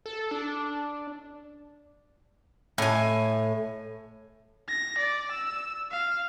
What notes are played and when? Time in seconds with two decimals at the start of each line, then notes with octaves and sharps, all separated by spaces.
0.06 A4
0.31 D4
2.78 A2 G#5
4.68 A#6
4.98 D5
5.32 E6
5.91 F5